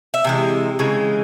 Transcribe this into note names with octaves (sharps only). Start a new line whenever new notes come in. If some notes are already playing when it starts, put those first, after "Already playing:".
E5
C3 E3 G#3
C#3 E3 G#3